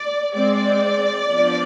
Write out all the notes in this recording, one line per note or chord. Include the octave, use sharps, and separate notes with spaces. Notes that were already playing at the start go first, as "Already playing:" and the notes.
Already playing: D5
G#3 C4 D5
F3 B3 D4